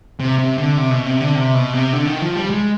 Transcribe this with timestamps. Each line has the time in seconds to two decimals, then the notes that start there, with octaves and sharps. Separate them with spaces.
0.20 C3
0.39 C3
0.58 D3
0.77 C3
0.91 B2
1.06 C3
1.20 D3
1.35 C3
1.55 B2
1.73 C3
1.93 D3
2.06 D#3
2.22 F3
2.36 G3
2.50 G#3